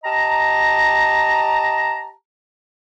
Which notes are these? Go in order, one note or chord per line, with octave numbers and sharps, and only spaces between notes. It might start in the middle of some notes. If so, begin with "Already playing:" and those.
G4 D#5 A5 A#5